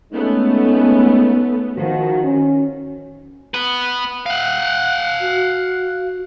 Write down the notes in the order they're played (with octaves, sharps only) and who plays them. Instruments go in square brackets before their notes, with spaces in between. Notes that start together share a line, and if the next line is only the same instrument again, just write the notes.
[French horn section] G#3 C#4 D#4 [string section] A3 B3
[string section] D#3 [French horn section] F3 F#4
[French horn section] C#4
[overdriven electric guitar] B3 B4
F5 F#5
[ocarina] F#4